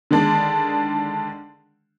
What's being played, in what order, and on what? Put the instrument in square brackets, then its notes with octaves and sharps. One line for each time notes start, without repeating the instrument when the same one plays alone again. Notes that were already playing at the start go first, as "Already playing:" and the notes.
[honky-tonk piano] D3 D#3 G#3 D4